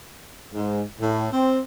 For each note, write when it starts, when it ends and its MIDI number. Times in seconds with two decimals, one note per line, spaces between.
0.54 0.83 44
1.00 1.29 45
1.33 1.61 60